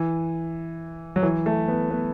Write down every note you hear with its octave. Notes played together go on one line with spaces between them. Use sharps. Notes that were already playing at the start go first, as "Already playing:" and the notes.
Already playing: E3
F#3
E3
A3
B3
B3